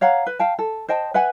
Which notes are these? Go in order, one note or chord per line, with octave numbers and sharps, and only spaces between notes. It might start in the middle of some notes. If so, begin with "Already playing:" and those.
C#5 F5 F#5 A#5
B4
F5 G5 A5
A4
C5 D#5 G5 A5
B4 E5 F#5 G#5